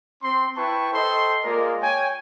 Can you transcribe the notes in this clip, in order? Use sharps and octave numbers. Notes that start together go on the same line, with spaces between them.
C4 C6
E4 B4 G5 A5 C#6
A4 C5 D#5 G5 C6
G#3 A#3 F4 A#4 D5
C#5 G5 G#5